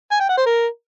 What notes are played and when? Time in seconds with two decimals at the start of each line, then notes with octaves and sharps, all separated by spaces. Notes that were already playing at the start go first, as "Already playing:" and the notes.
0.12 G#5
0.20 G5
0.29 F#5
0.37 C5
0.46 A#4